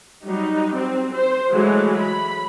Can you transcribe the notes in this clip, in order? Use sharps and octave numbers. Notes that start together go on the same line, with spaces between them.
F#3 G3 D#4
C4
C5
E3 F#3 G#3 A3
B5